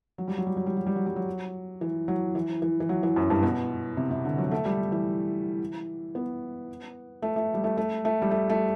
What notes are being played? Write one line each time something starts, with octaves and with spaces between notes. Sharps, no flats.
F#3
G3
F#3
G3
F#3
G3
F#3
G3
F#3
G3
F#3
E3
F#3
E3
E3
E3
F#3
E3
F#2
G2
B2
C3
C3
D3
F#3
A3
G3
E3
B3
A3
A3
G3
A3
A3
A3
G3
A3
A3